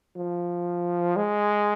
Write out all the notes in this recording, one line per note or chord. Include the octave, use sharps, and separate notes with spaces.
F3
G#3